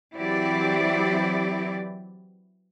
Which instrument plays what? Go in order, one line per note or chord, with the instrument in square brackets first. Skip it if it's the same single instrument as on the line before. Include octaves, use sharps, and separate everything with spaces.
[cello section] E3 F#3 C4 E4 G4 D5